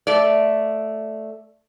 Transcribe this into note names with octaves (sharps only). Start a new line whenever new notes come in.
A3 D5